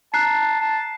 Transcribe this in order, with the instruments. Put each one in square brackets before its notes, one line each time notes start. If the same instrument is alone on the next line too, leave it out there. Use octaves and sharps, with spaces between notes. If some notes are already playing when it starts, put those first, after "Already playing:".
[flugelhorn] A5 [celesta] A#5 F#6 [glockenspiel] C7
[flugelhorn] A5